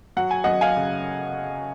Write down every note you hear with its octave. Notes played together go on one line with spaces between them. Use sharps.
F#3 F#5
G#5
F#2 D#5 F#5
F5 G#5
C#3